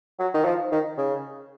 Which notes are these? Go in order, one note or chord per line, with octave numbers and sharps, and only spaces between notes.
F#3
D#3
F3
D#3
C#3